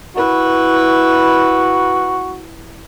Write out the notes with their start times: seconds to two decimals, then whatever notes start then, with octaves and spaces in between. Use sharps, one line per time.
0.16 E4 F#4 B4